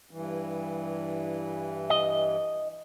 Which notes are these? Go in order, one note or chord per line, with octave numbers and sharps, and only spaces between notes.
G2 E3
D#5